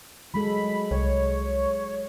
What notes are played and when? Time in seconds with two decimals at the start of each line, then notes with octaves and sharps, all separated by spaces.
0.34 F#3 G#3 A4 B5
0.91 C2 C#5